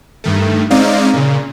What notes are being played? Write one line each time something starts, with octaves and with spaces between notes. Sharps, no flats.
G2 D#3 A3
G#3 C4 C#4 D#4 D5 F5
A#2 C#3